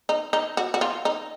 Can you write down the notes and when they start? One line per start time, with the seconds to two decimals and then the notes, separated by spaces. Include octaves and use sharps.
0.09 D#4
0.33 D#4
0.57 F#4
0.74 F#4
0.81 F4
1.05 D#4